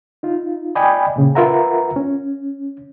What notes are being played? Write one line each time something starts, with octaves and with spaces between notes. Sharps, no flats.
D#4 F4
D5 D#5 G5 G#5 B5
A#2 C#3
F4 A#4 B4 E5 F#5 A#5
C#4